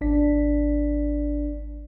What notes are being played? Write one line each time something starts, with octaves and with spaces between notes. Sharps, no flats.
G#1 D4 D5 B6